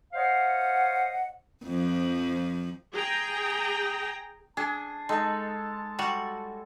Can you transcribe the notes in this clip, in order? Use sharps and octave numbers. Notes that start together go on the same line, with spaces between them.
C5 C#5 D#5 F5 F#5
F2 F3
G#4 G5 A#5
D4 G#4 A5
G#3 D#4 A4
G3 F#4